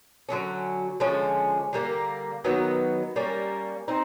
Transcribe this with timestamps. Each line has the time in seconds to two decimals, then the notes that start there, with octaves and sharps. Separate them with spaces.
0.29 D3 F#3 A#3 C#4
1.00 D3 F3 G#3 C#4
1.73 D3 G3 A#3
2.44 D#3 F#3 B3
3.16 G3 A#3 C#4
3.88 C4 D#4